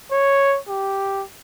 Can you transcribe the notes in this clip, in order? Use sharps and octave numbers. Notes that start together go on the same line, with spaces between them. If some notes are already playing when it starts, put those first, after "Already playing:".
C#5
G4